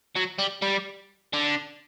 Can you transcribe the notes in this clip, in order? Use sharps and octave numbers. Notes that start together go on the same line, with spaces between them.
F#3
G3
G3
D3